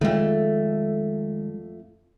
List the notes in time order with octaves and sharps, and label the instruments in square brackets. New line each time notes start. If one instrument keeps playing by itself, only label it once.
[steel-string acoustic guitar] F2 A3 [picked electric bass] D#3 G#3